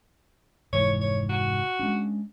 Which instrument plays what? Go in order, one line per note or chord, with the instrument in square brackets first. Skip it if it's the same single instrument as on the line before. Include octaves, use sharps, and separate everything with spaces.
[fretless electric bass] F1 G#2 E3 [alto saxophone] C#5
[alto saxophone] C#5
F#4
[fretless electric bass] G#3 C#4 D4